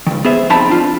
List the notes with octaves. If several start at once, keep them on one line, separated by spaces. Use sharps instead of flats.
C#2 D#3
B3 G#4 C5 E5
F2 C4 D#4 A5 B5
D4 F4